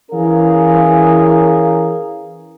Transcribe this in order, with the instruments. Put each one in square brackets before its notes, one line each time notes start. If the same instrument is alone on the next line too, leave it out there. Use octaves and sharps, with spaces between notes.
[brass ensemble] E3 C#4 G#4 A#4 F5